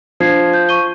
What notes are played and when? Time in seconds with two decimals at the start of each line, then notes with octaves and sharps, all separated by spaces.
0.20 F3 D4 G#6 C7
0.54 G6
0.69 C#6 D#7 G7